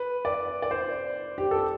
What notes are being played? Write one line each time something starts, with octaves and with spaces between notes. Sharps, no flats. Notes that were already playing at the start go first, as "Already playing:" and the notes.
Already playing: B4
D5
D5
C5
G4
A4